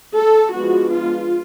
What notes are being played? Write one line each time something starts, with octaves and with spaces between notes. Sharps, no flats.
A4
F3 G#3 B3 D4 F#4
F4